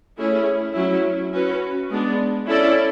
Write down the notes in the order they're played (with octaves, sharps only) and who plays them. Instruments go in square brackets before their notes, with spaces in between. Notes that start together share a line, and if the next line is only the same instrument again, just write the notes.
[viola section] A3 C#4 E4 G#4
F#3 C#4 E4
C#4 F#4 B4
G#3 B3 D4
C#4 E4 A4 D5